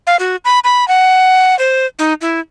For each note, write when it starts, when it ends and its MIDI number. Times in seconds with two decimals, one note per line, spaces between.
0.07 0.16 77
0.19 0.36 66
0.45 0.59 83
0.64 0.87 83
0.88 1.58 78
1.59 1.86 72
1.99 2.13 63
2.21 2.40 64